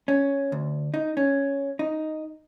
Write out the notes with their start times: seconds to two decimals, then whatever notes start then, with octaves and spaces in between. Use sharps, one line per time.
0.08 C#4
0.52 D2
0.94 D#4
1.17 C#4
1.79 D#4